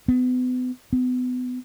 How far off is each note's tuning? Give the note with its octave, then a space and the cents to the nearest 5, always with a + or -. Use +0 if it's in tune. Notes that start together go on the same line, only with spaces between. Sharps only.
B3 +35
B3 +30